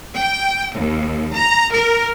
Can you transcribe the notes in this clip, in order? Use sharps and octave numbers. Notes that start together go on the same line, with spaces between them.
G5
D#2
A#5
A#4